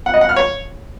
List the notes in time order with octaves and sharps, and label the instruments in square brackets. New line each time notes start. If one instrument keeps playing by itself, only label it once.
[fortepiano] F#5
D#5
F#5
F6
C#5